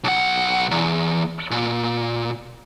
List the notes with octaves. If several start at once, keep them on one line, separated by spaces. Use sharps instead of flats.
B1 F#5
E2
A#2